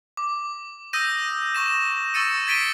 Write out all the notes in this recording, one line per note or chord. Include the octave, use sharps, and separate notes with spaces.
D6
D#6 E6 G6 A#6 D#7
C#6 A#6 E7
C#6 E6 A6 C#7 D#7
G#6 A6 B6 D7 D#7 G7